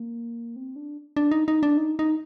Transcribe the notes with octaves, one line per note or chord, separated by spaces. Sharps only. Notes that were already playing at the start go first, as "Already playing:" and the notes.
Already playing: A#3
C4
D4
D4
D#4
D#4
D4
D#4
D#4